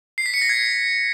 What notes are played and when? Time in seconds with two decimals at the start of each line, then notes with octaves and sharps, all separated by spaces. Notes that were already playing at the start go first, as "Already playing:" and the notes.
0.18 C7
0.26 B6
0.34 C#7
0.42 A#6
0.49 G#6